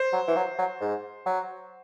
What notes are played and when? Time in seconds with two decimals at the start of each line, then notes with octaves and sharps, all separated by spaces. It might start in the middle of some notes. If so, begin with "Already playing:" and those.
Already playing: C5
0.13 F#3
0.27 E3
0.36 F#3
0.58 F#3
0.80 G#2
1.26 F#3